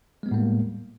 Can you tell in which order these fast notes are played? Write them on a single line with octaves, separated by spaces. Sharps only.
G#3 B3 G3 A2 A#3